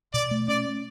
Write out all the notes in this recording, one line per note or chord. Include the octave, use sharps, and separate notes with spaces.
B2 D5
A3
C#4 D5